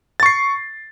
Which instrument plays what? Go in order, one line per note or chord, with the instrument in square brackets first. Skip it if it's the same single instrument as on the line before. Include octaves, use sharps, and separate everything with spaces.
[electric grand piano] A6
C#6
C7